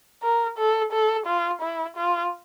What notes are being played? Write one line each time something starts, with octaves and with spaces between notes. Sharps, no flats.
A#4
A4
A4
F4
E4
F4